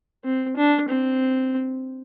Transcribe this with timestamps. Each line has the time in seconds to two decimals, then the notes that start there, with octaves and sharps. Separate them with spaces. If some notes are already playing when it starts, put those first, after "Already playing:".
0.24 C4
0.57 D4
0.89 C4